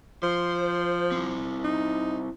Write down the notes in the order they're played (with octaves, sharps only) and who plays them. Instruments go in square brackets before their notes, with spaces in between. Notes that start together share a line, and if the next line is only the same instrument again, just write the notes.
[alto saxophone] F3 [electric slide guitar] C5
[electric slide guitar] C4 E4
[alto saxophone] D#4